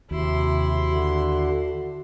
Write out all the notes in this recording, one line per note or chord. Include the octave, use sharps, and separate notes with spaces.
D#2 C3 E4 F#4 C6
D3 F#4